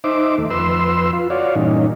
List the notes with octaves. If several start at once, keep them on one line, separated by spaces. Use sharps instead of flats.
D#4 C5 E5 D6
D#2 A3
F2 B4 C6 E6
F4
F#4 C#5 D5 F5
G2 A#2 E3 C#4 D#4